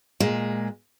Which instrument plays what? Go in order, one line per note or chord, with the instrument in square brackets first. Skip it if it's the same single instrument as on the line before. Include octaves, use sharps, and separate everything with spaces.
[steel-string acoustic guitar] A#2 G#3